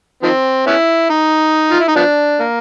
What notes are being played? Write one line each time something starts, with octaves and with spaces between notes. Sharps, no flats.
D#3 F3 C4
B3 C#4 E4
D#4
F4
E4
D#4
F3 B3 D4
A#3